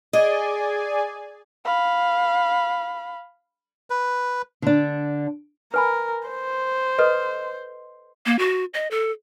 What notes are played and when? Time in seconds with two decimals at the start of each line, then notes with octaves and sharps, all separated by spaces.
0.13 G#4 D5 D#5 G#5
1.65 F5 B5
3.90 B4
4.62 D3 D4
5.74 A#4 B4 G#5 B5
6.28 C5
6.99 A4 B4 D#5
8.26 A#3
8.39 F#4
8.74 D#5
8.91 A4